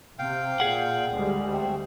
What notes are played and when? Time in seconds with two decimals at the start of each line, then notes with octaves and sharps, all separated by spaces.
0.19 C3 F5 G5
0.60 A#2 G#4 F#5
1.14 D2 G3 G#3
1.52 A3 C4